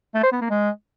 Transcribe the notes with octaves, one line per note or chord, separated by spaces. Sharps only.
A3
C5
B3
A#3
G#3